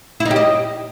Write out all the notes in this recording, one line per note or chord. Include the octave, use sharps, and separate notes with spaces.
E4
D#4
G4
D#5